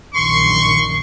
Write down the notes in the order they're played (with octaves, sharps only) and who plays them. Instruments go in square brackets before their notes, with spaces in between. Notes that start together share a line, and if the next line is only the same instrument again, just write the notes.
[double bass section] A#1 F#2 D#3 [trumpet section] C6 C#6